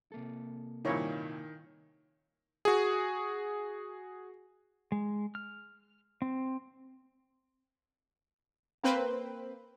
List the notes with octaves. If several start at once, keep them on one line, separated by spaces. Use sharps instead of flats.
C3 A#3 A4
G2 A#2 D#3 F3 E4 C#5
F#4 G#4
G#3
F6
C4
A#3 C4 B4 C5